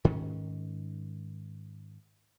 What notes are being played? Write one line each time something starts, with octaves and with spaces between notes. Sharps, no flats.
G#2 D#3 C#4